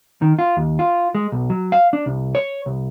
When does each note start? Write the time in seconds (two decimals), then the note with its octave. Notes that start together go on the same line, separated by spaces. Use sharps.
0.22 D#3
0.39 F4
0.57 D#2
0.79 F4
1.15 G#3
1.32 B1
1.50 F#3
1.72 F5
1.93 D4
2.06 C2
2.35 C#5
2.66 C2